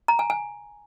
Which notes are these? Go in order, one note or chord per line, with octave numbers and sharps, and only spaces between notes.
A#5
G#5
G#5